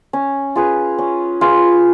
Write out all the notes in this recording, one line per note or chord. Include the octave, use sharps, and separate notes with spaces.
C#4
F4 G#4 B4
C#4
F4 G#4 B4